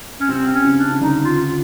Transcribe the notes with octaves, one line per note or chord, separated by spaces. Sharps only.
C#4
C3 C4
C#4
C#3
D4
C#3
D3 D#4
F4
F4